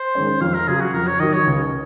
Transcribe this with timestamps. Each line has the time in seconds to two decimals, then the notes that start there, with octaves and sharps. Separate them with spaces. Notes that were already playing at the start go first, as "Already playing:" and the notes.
Already playing: C5
0.15 D#3 G#3 C#4
0.41 F2 F5
0.54 A#4
0.68 C#3 F#3 G#4
0.81 F#4
0.94 F2 A#4
1.07 C#5
1.20 D#3 F#3 D#5
1.33 C#5
1.47 C#2